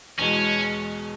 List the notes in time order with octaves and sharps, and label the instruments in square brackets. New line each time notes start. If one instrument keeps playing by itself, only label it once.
[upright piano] E2 B2 G#3 [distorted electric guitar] C#4